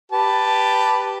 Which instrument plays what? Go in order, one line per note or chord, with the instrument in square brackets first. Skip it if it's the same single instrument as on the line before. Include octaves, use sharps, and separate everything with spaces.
[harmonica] G4 B4 A5